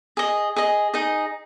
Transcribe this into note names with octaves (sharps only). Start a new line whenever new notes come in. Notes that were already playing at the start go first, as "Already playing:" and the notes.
G#4 D#5
G#4 D#5
D#4 G#4 D#5